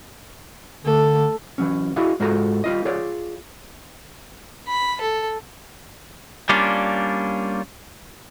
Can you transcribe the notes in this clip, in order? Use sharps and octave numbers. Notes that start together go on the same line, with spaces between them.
D3 A3 A4
E3 F#3 C#4
E4 F#4 G#4 D5 D#5 F5
G#2 G#3 F4 F#4 A4 A#5
G3 F4 D#5
F4 G#4 C#5 D5
B5
A4
G3 A#3 C#4 D4 F4